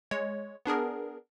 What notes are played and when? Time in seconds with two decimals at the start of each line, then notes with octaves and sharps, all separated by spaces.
0.11 G#3 C#5
0.66 B3 D4 G#4 A#4